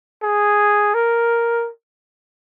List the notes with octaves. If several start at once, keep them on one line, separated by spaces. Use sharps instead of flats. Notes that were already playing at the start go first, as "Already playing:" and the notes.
G#4
A#4